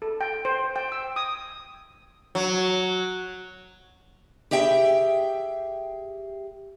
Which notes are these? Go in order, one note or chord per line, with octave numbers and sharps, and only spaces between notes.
A4
G5
C5
G5
E6
D#6
F#3
G4 G#4 E5 G5